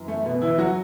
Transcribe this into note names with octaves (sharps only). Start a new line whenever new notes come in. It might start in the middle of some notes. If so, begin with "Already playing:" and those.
Already playing: F#2 E3
A3
B2 B3
E3 E4
F#3 F#4